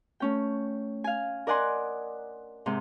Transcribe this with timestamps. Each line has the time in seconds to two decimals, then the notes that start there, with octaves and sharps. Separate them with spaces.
0.20 A3 C#4 G5
1.04 F5 G#5
1.47 A#4 D5 D#5 F#5 G#5 C6
2.66 G#2 C3